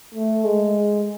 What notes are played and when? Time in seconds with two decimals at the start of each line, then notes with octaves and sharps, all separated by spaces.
0.14 A3
0.44 G#3